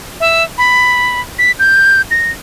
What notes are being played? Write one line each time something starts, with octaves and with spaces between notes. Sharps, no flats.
E5
B5
B6
G6
A#6